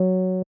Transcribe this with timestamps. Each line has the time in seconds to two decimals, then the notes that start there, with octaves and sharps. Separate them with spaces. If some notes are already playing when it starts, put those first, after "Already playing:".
Already playing: F#3